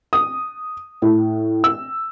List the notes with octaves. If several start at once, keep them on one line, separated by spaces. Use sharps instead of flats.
D#6
A2
E6